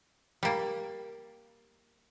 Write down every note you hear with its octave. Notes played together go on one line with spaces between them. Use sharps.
G3 A#3